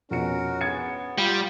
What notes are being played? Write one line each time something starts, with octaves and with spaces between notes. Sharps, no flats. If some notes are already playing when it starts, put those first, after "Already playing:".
F2 B2 C#4 F#4 A#4 C#7
B3 G#6 A6 C#7
G3 F4